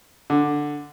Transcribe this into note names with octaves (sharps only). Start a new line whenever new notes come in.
D3